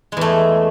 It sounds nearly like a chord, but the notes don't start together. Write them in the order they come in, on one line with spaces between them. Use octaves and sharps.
G#3 E2 A3